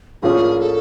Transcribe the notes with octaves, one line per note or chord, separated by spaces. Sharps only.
A#1 A2 F3 A#3 C#4 G#4
A4